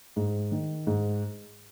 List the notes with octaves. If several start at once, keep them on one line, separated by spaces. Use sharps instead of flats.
G#2
D#3
G#2